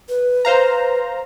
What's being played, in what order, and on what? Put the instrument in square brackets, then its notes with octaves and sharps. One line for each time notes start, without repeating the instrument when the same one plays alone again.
[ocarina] B4
[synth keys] C5 F5 A#5